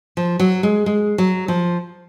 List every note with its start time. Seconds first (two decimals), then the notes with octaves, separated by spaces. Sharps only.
0.17 F3
0.40 F#3
0.63 G#3
0.86 G#3
1.18 F#3
1.48 F3